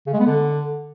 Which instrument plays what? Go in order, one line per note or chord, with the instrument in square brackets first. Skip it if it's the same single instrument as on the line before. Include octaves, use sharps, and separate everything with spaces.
[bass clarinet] C#3
G#3
B3
D3